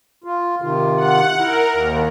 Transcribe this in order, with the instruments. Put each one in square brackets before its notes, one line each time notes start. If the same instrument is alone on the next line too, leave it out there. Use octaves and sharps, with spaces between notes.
[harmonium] F4
C3 D#3 F4
[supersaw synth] F#5
[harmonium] E4 [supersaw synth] A#4
[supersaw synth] D#2